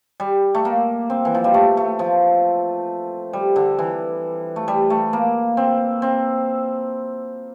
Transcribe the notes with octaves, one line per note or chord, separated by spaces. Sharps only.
G3
A3
A#3
C4
E3
F3
G3
A3
A3
F3
G3
D3
E3
A3
G3
A3
A#3
C4
C4